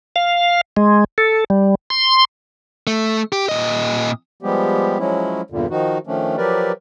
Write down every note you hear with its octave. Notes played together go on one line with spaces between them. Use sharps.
F5
G#3
A4
G3
C6
A3
G4
A#2 D#5
F3 G3 G#3 B3 G4
F3 F#3 G#3 C#4 E4
E2 G2 A#2 D3
D#3 F3 D#4 F#4
D#3 F3 A3 C#4 D4
F3 F#3 G4 A#4 B4 D5